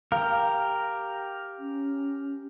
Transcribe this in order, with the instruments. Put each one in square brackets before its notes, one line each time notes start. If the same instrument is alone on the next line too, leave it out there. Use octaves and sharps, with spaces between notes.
[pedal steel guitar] G4 A#4 [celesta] F5
[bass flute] C#4